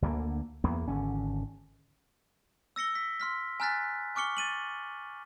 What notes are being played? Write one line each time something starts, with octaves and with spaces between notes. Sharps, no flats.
D2 D3 F3 A#3
E2 A#3 B3
G#1 D3 C#4
E6 A#6 C#7 G7
B6
C6 F6 B6
G#5 A#5 F6 F#6 A6 B6
G#5 C#6 D6 F6 C#7 G7
A6 D#7 F#7